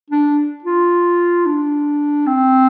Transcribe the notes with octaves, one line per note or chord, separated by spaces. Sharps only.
D4
F4
D4
C4